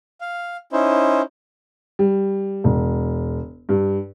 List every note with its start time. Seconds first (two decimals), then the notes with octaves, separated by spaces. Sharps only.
0.21 F5
0.72 C#4 D#4 E4 C5
1.99 G3
2.64 E1
3.69 G2